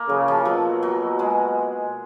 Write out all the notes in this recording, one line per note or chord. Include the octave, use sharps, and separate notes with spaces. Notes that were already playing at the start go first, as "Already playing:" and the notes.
Already playing: A#3
C#3 F#3
F3
B2 F#3
F#3
G#3